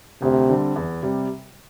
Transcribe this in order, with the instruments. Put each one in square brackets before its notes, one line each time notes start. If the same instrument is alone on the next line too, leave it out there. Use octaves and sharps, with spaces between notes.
[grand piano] D2 [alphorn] C3
[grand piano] D3 G3 C4
E2
C3 G3